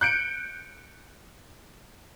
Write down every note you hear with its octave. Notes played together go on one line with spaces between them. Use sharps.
F#6 G6 C#7 D7